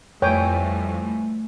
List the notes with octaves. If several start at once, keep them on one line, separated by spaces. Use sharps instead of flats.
F2 A2 G3 A3 B4 C#5 G5 G#5